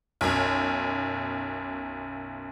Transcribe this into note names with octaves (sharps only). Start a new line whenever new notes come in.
B1 F#2